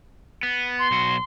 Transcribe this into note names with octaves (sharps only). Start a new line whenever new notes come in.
B3
C6
B1 F#4